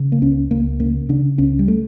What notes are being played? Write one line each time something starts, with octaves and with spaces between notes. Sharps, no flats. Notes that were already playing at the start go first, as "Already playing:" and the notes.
Already playing: C#3
A#3
C#2 C#4
C#2 A#3
C#3 A#3
C#3 D4
C#2 C#4
G3
A3